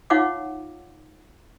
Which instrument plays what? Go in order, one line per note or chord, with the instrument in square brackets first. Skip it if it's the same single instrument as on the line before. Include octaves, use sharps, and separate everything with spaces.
[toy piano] D#4 F4 C#5 F5 F#5 D6